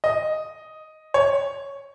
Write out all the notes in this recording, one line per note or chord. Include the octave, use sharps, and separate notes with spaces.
D#5
C#5